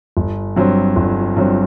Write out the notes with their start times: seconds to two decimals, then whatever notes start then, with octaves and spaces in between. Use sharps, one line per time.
0.17 G1
0.56 G2 F#3 C4
0.96 G1
1.37 G2 F#3 C4